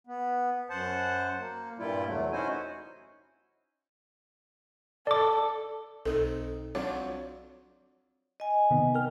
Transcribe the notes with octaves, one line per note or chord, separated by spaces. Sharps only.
B3
F#2 C5 F#5 A5
A#3
G2 A#2 G3 E4 F4
E2 C3 F#3 A3
C#4 D#4 E4 F#4 C5 G#5
A4 D5 D6
B1 C4 D#4 A4
F2 F#3 D4 C#5
D#5 G#5
C3 D#3 B3
A#4 G5 F6